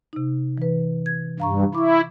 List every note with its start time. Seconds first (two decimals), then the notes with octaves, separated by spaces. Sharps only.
0.13 C3 D#4
0.58 E3 B4
1.06 G#6
1.40 G2 F5 A#5 C#6
1.75 E4 C#6 D6